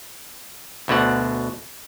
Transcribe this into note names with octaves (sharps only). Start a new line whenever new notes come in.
D2 B2 D3 F#5